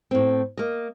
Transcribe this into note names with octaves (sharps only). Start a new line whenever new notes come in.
A2 C4
A#3 D#5